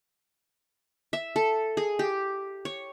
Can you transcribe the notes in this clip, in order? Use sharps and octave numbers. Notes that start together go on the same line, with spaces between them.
E5
A4
G#4
G4
C#5